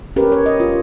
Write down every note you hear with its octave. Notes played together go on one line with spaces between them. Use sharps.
C#4 G4 A#4 B4
C#5
D#5
F4